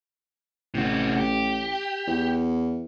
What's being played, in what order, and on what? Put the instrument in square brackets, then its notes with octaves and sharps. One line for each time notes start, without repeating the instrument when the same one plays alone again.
[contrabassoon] A1 [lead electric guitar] C3 F#4
[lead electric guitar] G4
[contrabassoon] E2